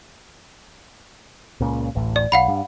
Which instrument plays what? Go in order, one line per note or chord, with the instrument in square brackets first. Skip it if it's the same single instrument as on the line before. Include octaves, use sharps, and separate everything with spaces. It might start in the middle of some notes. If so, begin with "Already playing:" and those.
[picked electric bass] C#2 A#2 C#3
D1 A1 A2
[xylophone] D5
[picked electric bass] B1 [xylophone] F5 F#5 B5
[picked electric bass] G2